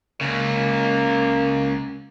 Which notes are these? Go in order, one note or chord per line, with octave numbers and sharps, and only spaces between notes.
C#2 C#3 A#3